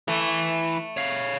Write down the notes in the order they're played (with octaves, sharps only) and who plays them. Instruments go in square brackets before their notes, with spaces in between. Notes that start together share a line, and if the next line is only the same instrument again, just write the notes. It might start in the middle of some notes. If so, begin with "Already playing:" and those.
[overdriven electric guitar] E3 [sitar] A3
[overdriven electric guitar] C#5 F5